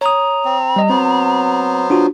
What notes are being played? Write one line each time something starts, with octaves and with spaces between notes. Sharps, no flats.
C#5 A#5 D#6
C4
G3 D#5
F#3 B3 C4 C5
D4 F4 F#4